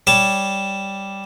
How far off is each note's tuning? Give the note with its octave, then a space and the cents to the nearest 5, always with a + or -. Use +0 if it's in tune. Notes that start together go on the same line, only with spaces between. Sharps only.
G3 +0 C#5 +0 A5 +0